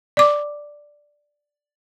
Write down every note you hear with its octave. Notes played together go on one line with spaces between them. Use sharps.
D5 D6